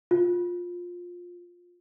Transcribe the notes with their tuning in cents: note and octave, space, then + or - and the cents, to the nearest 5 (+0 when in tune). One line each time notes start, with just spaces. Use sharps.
F4 +15